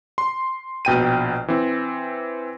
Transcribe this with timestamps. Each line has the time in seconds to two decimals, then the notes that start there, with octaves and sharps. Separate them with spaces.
0.18 C6
0.85 A#1 B2 G5 D#7
1.48 E3 C4